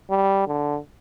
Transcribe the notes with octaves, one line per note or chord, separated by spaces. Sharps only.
G3
D3